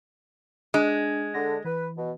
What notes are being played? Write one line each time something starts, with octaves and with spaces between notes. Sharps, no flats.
G#3 D4
D3 A#6
E3 B4
B2